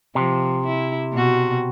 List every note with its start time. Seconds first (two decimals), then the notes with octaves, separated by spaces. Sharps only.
0.15 C3 F3
0.66 E4
1.13 B2 F#4